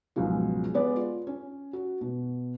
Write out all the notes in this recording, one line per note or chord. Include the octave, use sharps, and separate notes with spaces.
C#2 G#2 B2 F3 F#3 G#3
G#3 B3 B4 D5
F4
C#4
F#4
B2